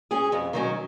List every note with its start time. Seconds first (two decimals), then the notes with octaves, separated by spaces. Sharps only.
0.11 C#4 G#4
0.32 F2
0.53 D#3 F#3 C#4